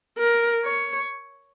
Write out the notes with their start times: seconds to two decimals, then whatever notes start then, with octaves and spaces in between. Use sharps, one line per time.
0.18 A#4
0.65 C#5